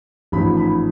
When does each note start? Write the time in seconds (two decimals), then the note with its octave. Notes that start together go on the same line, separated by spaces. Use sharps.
0.32 A1 G#2 F3 B5
0.57 B5